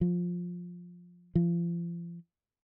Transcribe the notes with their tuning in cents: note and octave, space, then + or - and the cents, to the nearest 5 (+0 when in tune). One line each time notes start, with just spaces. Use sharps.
F3 +10
F3 -35